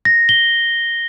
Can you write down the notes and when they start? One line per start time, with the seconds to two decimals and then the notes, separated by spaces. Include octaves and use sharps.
0.05 A#6
0.29 G7